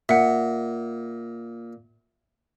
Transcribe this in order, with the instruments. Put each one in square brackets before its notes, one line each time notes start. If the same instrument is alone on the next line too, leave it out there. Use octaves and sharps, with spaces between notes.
[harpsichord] A#2 [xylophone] E5 F#5